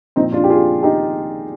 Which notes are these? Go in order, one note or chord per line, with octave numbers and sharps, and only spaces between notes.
A#2 F3 C4 D#4
D4 F4
G4
F4 G#4
D#4 G4